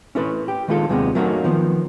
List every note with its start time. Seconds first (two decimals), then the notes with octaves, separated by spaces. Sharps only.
0.15 C#4 E4 A4 B4
0.48 G4
0.68 D#3 G#3 B3 F4 G#4 A4
0.89 D#2 C3 G3 G#3 B3
1.15 F#3 A3 A#3 C#4 D#4 F#4
1.44 D#3 F3 B3